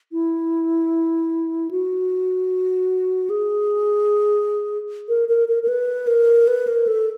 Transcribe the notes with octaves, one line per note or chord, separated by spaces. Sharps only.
E4
F#4
G#4
A#4
A#4
A#4
A#4
B4
A#4
B4
A#4
A4